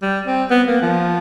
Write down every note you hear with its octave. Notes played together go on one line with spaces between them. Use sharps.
G3
C4
B3
A#3
F3